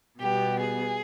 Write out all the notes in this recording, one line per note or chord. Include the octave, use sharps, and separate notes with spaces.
B2 G3 B3 G4
G#4